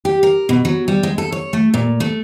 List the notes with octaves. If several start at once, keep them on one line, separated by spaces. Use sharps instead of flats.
G4
A#4
B2
F#3
G3
G#3
A4
C#5
A3
A#2
A3